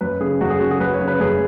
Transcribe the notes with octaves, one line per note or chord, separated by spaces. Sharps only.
F#2 B4
C#3 G#4
F#2 F#4
G#4
C#3 F#4
G#4
F#2 B4
C#5
C#3
B4
F#2 G#4